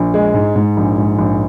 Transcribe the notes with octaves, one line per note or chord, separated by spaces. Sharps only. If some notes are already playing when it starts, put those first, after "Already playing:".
Already playing: A#1
G#3
G#2
G#2
A#1
G#2
A#1